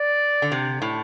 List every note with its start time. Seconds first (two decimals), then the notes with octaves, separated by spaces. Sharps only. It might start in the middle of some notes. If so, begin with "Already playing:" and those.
Already playing: D5
0.42 D3
0.52 C3
0.82 A2